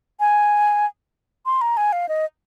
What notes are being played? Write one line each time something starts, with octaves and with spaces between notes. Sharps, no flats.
G#5
C6
A#5
G#5
F5
D#5